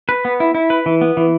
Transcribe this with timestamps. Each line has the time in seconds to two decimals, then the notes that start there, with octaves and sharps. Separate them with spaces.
0.09 B4
0.25 B3
0.40 E4
0.55 E4
0.70 B4
0.86 E3
1.01 B3
1.17 E3